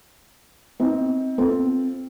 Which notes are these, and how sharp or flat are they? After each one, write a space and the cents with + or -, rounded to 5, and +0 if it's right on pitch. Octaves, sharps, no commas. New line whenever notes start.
C4 +0 D#4 +30
C4 +0 F4 +0 A4 +0